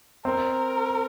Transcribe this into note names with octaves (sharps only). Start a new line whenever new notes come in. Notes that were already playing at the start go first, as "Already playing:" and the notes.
C4 A#4